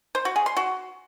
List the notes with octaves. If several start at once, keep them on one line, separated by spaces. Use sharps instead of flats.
C5
F#4
G#4
C6
F#4